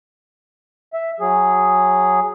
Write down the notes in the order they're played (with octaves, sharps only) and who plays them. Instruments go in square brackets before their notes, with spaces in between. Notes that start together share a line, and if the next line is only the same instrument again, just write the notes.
[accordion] E5
F#3 G#4